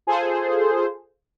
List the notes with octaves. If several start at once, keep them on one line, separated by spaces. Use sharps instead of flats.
F4 G#4 A4 C5